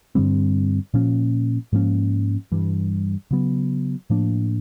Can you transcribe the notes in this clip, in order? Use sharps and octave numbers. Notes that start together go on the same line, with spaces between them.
G2 D3 G3 C4
A#2 F3 A#3 C#4
G#2 F3 A#3 C#4
G2 E3 G3
C#3 F#3 B3
A2 F3 A#3 D4